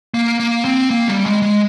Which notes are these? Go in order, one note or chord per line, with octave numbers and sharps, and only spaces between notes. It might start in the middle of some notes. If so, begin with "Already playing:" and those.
A#3
A#3
C4
A#3
G3
G#3
G#3